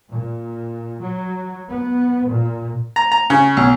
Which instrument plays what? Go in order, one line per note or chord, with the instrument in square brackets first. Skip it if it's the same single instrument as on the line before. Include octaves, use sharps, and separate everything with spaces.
[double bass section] A#2
F#3
B3
A#2
[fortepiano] A#5
A#5
C#3
B1